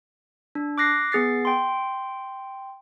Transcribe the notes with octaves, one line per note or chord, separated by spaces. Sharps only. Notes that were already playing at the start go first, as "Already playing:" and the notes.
D4
D6 F#6 A#6 C7
B3 G#4 A6 C7
G5 C6